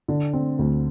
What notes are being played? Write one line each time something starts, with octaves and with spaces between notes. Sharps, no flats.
D3
C4
D2